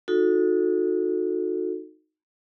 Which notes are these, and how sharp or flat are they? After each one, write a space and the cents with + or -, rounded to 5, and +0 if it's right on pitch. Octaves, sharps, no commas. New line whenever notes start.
D#4 +0 F#4 -30 A4 +0